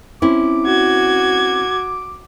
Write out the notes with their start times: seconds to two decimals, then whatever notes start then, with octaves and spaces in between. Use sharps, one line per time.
0.22 C4 C#4 E4 D6
0.66 F#4 G#6